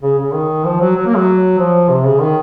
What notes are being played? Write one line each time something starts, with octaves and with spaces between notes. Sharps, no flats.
C#3
C#3
D#3
F3
F#3
F#3
A#3
F#3
F3
C3
C#3
D#3